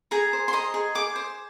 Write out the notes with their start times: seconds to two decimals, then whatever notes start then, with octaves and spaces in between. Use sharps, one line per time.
0.11 G#4 A#5
0.33 C5
0.48 C6
0.53 D#5 A#5
0.74 G#4
0.95 G#4 D6
1.16 C5